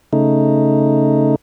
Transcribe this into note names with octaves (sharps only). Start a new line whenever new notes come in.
C#3 A3 D#4